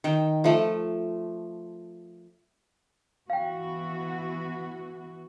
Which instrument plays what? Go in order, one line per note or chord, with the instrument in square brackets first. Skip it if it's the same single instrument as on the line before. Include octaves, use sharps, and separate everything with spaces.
[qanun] D#3 G5
F3 A3
[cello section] E3 B3 F#4 [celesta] F5 G5